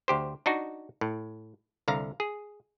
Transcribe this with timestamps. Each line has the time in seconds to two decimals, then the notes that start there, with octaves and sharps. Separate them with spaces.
0.08 D2 G4 C5
0.46 D4 D#4 F#4
1.01 A2
1.88 C2 D3 F5 A#5
2.20 G#4